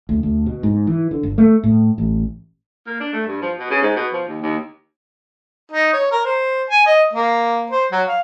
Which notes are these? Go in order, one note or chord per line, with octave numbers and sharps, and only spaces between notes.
D2
D2
B2
G#2
E3
D3
G1
A3
A2
A1
A#3
D4
A3
G2
F3
B2
C#3
G#2
B2
F3
D#2
D#2
D#4
C#5
A#4
C5
G#5
D#5
A#3
C5
F#3
F5